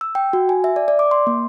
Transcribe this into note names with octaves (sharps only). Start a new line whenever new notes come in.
E6
G5
F#4
G#5
E5
D5
D5
D6
C6
A#3